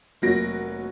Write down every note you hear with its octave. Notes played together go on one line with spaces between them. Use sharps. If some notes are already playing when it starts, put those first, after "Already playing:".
F1 F#3 A#3 F#4 A#6 D7